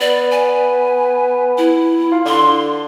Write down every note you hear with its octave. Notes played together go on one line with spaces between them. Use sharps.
B3 D5
G#5
E4
F4
D3 C6